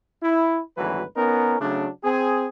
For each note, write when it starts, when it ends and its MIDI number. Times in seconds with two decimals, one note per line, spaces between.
0.23 0.60 64
0.77 1.03 32
0.77 1.03 38
0.77 1.03 52
0.77 1.03 54
0.77 1.03 71
1.16 1.60 59
1.16 1.60 61
1.16 1.60 63
1.16 1.60 70
1.60 1.88 49
1.60 1.88 54
1.60 1.88 57
1.60 1.88 62
2.04 2.47 60
2.04 2.47 68